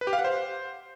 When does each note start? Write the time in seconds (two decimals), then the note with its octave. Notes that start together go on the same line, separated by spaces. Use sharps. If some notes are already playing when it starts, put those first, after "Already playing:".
0.01 B4
0.07 G4
0.13 F5
0.19 F#5
0.24 C5